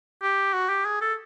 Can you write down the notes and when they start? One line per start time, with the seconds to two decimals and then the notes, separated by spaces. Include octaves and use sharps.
0.22 G4
0.54 F#4
0.69 G4
0.86 G#4
1.02 A4